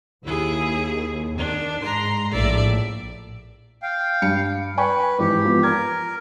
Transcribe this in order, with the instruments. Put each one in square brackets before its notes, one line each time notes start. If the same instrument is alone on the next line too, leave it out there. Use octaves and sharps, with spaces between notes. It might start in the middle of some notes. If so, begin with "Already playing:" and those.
[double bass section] D#2 [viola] E4 G#4
[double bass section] D#3 [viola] D4
[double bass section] G#2 [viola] A#5 C6
[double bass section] A#1 A2 [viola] D5 E5
[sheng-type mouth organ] F5 G5
[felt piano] G2 C#7
[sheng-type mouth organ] B4 [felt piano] G5 G#5 C#6
[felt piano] G#2 E3 [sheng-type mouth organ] G4
[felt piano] F3 B3
[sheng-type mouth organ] A#4 [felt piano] G#6